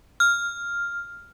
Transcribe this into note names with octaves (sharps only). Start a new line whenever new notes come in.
F6